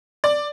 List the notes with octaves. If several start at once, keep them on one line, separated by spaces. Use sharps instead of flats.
D5